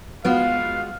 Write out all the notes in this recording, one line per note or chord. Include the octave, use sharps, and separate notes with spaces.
G#3 B3 F4 F#4 F5